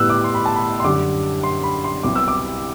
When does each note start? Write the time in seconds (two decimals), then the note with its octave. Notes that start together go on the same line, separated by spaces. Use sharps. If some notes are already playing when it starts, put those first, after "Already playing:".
Already playing: A2 G3 B3 E6 F#6
0.10 D6
0.24 C6
0.35 B5
0.46 A5
0.56 B5
0.80 C6
0.84 F#2 D3 G3 D6
1.43 C6
1.63 B5
1.84 C6
2.03 C2 C3 F#3 B3 D6
2.15 E6
2.28 D6